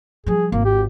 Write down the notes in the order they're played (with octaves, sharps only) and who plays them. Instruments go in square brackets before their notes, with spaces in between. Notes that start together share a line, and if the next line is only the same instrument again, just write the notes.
[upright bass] F3 G3 [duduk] G#4
[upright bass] G#1 [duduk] A#3
[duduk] G4